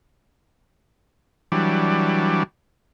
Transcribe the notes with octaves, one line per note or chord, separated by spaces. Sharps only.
E3 F#3 G3 D4